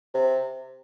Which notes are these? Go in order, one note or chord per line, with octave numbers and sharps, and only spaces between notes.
C3